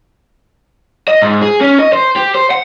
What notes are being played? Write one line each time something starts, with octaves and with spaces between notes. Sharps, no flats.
D#5
G#2
G#4
C#4
D#5
C5
G4
C5
F#5